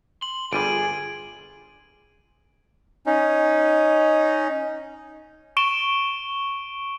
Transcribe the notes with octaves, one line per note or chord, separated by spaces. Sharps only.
C6 F#7
G1 G3 F4 G#4 D7 D#7
C#4 D#4
C#6 D7 E7 G7